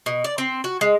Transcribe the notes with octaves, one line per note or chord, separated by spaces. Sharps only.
B2
D5
C4
F#4
G#3